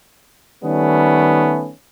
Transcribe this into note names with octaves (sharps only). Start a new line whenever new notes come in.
D#3 G3 A3 B3 C#4